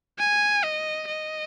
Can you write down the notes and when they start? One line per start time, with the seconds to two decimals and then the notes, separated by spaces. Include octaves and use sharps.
0.19 G#5
0.64 D#5
1.08 D#5